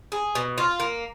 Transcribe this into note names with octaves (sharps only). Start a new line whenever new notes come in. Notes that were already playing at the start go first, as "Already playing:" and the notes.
G#4
B2
F4
A#3